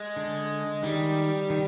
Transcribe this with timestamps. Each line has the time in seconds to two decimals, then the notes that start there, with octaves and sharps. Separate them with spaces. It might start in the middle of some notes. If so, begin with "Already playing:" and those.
Already playing: G#3
0.16 D3
0.83 D#3 G3
1.50 D#3